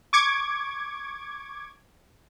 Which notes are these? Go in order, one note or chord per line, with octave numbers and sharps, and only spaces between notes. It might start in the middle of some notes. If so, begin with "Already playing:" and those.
C#6 D6 G#6